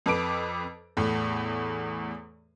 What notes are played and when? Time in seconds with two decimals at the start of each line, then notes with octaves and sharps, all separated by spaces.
0.06 F2 A4 B4 D6 D7
0.97 E2 A2